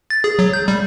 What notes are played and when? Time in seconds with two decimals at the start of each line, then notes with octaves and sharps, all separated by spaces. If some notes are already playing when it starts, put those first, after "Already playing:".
0.10 A6
0.24 G#4
0.39 F#3
0.53 G6
0.68 G3